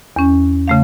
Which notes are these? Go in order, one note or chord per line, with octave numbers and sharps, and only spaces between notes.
E2 C#4
C#3 A3 F5